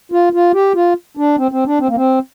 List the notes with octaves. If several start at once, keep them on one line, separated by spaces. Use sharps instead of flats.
F4
F4
G4
F4
D4
C4
C4
D4
C4
A#3
C4